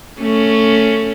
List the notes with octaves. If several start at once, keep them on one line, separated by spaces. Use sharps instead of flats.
A3 C#4